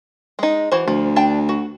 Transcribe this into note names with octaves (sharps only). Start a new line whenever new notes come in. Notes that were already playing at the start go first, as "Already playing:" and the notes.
G#3 D#4
E3 F#4 C5
D2 F3
D4 G5 A5
F#4